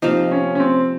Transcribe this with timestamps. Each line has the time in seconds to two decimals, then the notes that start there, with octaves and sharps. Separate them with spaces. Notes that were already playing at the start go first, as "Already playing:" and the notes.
0.02 C3 F3 A#3 D#4
0.31 C#4
0.55 C#4
0.60 C4